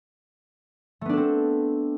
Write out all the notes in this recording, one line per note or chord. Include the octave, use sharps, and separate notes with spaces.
A3 B3 C4 D4 A4